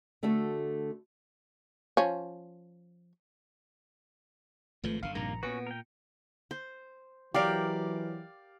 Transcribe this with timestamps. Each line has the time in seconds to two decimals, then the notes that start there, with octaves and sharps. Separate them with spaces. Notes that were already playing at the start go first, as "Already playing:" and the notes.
0.23 D3 A3 D4 F#4 A4
1.97 F3 C#4
4.84 G#1 G#2 F3 A3 F4 B4
5.03 F#1 D3 F5 C#7
5.15 A#1 G2 C3 D#3 A#3 A#5
5.43 A#2 B3 C#4 F#4
5.67 A#4 G5
6.51 C5
7.34 E3 F#3 G4 A#4 D5 F5